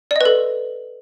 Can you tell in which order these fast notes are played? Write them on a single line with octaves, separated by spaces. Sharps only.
D5 D#5 B4 A4